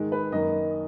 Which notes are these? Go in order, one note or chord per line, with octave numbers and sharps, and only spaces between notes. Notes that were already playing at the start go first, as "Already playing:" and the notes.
Already playing: G#2 D#3 G#3
B4
F#2 D#3 A#3 D#5